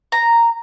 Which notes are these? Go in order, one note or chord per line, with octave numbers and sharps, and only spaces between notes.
A#5